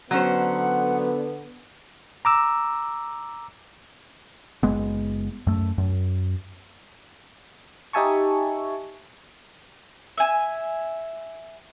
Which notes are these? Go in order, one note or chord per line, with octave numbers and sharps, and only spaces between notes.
D3 F#3 B3 C#4 C5 F#5
A#5 D6 E6
F#1 G#3 B3
F#2 A3
F#2
D#4 G4 E5 G#5 A5 C#6
E5 G#5